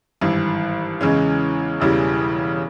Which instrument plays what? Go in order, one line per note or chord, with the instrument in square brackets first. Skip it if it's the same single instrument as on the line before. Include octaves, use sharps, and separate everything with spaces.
[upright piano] G#1 G2 E3
E2 C#3 E3 G#3 C#4
E1 E2 C#3 E3 G3